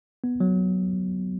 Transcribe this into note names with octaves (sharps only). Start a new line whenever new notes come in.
B3
F#3